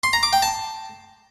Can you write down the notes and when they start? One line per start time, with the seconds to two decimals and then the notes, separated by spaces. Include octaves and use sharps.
0.03 C6
0.13 A#5
0.23 D6
0.33 G5
0.42 A5